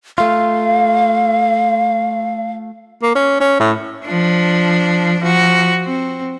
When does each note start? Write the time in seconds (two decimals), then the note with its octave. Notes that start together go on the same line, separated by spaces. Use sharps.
0.18 A3 F4 F5
3.03 A#3
3.15 C#4
3.40 C#4
3.60 A2
4.06 F3 D4
5.20 F3 F#4
5.85 C4